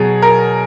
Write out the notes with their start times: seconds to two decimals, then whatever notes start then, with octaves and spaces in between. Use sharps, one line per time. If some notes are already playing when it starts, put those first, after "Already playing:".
Already playing: B2 F#3 G#4
0.22 A#4